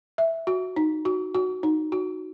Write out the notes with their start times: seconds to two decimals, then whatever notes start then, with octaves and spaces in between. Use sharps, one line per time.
0.18 E5
0.47 F#4
0.76 D#4
1.05 F#4
1.35 F#4
1.63 D#4
1.92 F#4